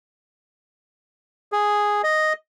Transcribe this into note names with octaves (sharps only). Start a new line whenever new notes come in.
G#4
D#5